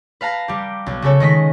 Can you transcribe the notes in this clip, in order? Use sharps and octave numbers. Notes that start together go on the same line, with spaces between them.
B4 F5 A5 A#5
G3 G4
B1
C#3 G#4 A4 C#5
D#3 G#3 D#5 B6